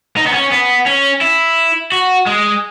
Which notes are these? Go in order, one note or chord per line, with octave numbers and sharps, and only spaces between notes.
D#4
B3
C#4
B3
C#4
E4
F#4
G#3